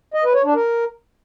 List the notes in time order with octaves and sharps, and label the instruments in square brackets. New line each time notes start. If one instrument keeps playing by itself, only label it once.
[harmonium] D#5
B4
C#5
D4
A#4